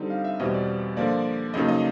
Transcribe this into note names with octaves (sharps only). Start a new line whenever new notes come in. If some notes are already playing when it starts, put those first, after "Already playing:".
Already playing: D3 G3 C4 D#4
F5
E5
E2 B2 G3 C4 D#5
D5
D3 F3 A#3 D5
F2 C#3 F#3 A#3 D#4 D#5
D#5